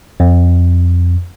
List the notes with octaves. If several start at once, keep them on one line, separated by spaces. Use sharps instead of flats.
F2